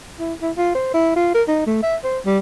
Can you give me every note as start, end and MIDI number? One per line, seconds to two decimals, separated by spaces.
0.20 0.34 64
0.42 0.51 64
0.57 0.73 65
0.75 0.90 72
0.94 1.15 64
1.16 1.34 65
1.34 1.43 70
1.48 1.62 63
1.66 1.78 57
1.83 1.96 76
2.04 2.19 72
2.25 2.38 55